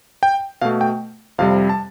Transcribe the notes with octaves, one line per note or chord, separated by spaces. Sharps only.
G5
B2 A3 F5
G5
F2 C3 G3 F5
A5